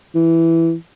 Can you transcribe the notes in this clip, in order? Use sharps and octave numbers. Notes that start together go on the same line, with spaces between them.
E3